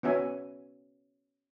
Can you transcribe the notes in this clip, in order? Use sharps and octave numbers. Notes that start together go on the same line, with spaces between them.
B3 C#4 F#4 E5 G#5